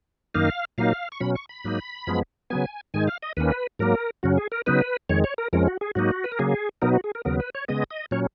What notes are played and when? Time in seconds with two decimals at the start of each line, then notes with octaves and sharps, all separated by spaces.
0.34 F#2 D#3 A#3 D#4 F5
0.78 A#2 F#3 A#3 D#4 F5
1.12 C#6
1.20 B2 F#3 C#4 B5
1.35 C#6
1.49 B5
1.64 G#2 F#3 A#3 D#4
2.07 F#2 F3 G#3 B3
2.50 C#3 F#3 B3 G#5
2.94 G#2 D#3 G#3 D#4 G#5
3.07 F5
3.23 D#5
3.37 D#2 D#3 A#3 C#4 B4
3.79 G#2 F#3 A#3 A#4
4.23 F#2 C#3 F#3 C#4 F#4
4.37 G#4
4.52 A#4
4.66 C#3 F#3 B3 D#4 B4
5.09 F2 D#3 G#3 C#5
5.24 C#5
5.38 A#4
5.53 F2 F3 G#3 C#4 A#4
5.67 F#4
5.81 G#4
5.95 G#2 F#3 A#3 D#4 F#4
6.24 B4
6.32 A#4
6.39 C#3 F#3 A#3 G#4
6.82 B2 F#3 B3 D#4 A#4
6.93 F#4
7.04 G#4
7.15 A#4
7.25 D#2 C#3 F#3 B3 A#4
7.40 B4
7.55 C#5
7.68 C#3 G#3 B3 D#5
7.91 D#5
8.11 A#2 F#3 C#4 C#5